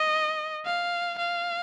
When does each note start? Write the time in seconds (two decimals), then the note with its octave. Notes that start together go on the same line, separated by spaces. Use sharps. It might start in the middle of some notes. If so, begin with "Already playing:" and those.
Already playing: D#5
0.66 F5
1.19 F5